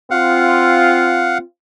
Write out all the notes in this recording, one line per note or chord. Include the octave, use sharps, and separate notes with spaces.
C4 F4 F5 F#5